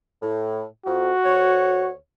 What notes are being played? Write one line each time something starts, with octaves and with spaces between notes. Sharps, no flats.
A2
F2 F#4
D2 C#5